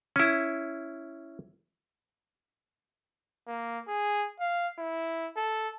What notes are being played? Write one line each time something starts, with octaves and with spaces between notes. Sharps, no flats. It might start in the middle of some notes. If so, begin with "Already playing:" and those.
C#4 E4
A#3
G#4
F5
E4
A4